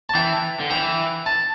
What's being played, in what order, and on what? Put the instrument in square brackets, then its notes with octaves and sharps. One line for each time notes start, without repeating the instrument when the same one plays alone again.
[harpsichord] A5
[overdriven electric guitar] E3 [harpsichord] G5
[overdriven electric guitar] D3
[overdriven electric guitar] E3 [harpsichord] G5
[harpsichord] A5